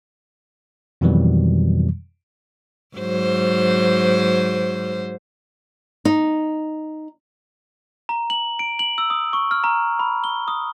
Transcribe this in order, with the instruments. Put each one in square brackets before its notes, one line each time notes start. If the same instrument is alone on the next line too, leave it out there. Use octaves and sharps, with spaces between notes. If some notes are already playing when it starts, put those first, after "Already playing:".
[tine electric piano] F2 B2 D#3 E3 F#3 G3
[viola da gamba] G#2 F#3 C5
[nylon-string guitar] D#4
[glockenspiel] A#5
F#7
D7
F#7
E6
D#6
C#6
F6
A#5
B5
G7
D#6